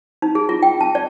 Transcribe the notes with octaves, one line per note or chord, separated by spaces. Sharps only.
D#4
G#4
F4
G5
A5
D5